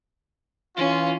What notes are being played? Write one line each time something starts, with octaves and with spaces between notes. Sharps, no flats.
E3 C#4 F4